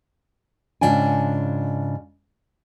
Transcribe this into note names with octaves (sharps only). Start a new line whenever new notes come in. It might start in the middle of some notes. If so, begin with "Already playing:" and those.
G#2 C#3 D4 F4 G5 G#5